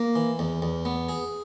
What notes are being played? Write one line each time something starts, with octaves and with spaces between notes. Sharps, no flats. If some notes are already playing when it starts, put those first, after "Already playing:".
Already playing: A#3
E3
E2
E2
B3
G#4